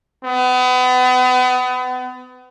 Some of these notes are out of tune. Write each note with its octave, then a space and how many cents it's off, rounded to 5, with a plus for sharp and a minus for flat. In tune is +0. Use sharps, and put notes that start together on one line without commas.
B3 +35